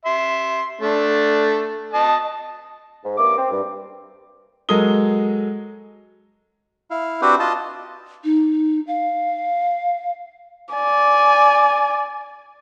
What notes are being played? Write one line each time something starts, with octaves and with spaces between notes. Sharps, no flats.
E5 C6
A3 D4
D#5 A5
G#2
G2 A#3 C#4 E5 D6
C4
G2
F#3 G#3 A4 A#4 D#6 G7
E4 F5
C4 D4 F#4 G4 B4 C5
F4 D#5 A5
D#4
F5
D5 G#5